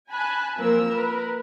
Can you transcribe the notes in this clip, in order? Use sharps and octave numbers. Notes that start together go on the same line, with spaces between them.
G#5 A5 B5 F#6
F3 A#3 C4 A#4 E6
A#4 B4